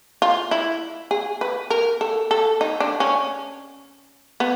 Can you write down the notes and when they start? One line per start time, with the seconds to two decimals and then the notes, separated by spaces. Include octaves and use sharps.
0.22 F4
0.51 E4
1.11 G#4
1.41 B4
1.70 A#4
2.01 A4
2.31 A4
2.61 D#4
2.80 D4
3.00 C#4
4.40 B3